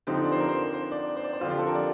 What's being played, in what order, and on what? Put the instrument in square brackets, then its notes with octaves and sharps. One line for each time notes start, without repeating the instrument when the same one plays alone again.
[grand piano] D3 F3 C4 D#4 [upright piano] G4
[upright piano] D5
C5
A#4
C5
C5
D5
C5
D5
C5
[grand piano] D3 F3 C4 F4 [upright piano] D5
[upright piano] G4
A4
A#4
D5